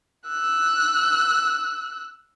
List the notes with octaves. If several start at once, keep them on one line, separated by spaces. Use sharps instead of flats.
E6 F#6